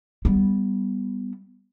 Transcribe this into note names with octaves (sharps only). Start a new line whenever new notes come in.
G3 B3